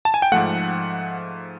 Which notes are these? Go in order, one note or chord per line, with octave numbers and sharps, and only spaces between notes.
A5
G#5
G5
G#2 F3 A3 F#5